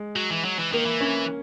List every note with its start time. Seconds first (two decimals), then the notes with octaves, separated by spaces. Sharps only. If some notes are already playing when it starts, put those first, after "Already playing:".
Already playing: G#3
0.16 F#3
0.31 E3
0.45 F#3
0.59 E3
0.72 D#3 A#3
0.86 E3
1.00 C#4